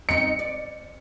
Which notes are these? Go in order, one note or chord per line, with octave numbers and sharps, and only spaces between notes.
C4 D#4 C#7
D5